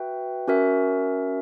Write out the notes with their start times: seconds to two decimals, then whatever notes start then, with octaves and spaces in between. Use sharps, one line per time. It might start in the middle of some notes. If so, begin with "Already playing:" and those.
Already playing: F#4 B4 E5 G5
0.48 C#4 F#4 A#4 E5